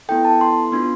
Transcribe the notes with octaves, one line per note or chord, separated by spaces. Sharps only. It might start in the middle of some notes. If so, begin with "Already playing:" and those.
B3 E4 A4 G5
A5
C6
B3 D4 F4 C6